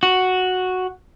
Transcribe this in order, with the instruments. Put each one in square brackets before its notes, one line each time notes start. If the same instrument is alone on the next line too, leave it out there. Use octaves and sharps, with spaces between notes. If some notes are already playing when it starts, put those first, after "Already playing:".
[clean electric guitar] F#4